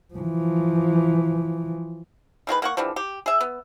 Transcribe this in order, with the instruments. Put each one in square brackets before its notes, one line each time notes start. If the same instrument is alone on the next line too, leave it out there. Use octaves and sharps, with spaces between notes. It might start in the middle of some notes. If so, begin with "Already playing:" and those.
[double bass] E3 F3
[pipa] D#3 G#3 F#4 B4
A#3 F#5 C#6
D3 E3 F3 G3
G4
G#4 E5
B3